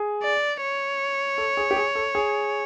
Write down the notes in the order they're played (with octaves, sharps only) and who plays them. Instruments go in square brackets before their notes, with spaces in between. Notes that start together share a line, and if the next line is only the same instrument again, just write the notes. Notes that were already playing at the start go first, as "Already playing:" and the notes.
Already playing: [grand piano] G#4
[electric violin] D5
C#5
[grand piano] A4
G#4
G4
G#4
A4
G#4